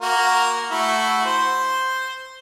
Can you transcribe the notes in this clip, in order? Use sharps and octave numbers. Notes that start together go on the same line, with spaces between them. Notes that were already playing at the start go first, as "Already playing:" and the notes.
A#3 F#4 A#4
A3 E4 F#4
C5